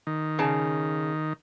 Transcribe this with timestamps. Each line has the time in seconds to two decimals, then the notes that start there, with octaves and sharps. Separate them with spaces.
0.07 D#3
0.39 C#3 A5